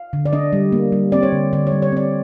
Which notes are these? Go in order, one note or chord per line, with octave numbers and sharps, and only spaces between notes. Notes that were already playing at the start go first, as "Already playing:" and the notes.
Already playing: F5
D3
D5
D4 D#5
G3
A#3
G3
C4 D5
C#5
D3
D3 D5
C#5
G3
C#5
C4 D5